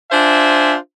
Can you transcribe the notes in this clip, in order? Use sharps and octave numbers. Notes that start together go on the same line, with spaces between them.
D4 F4 C5 E5 G#5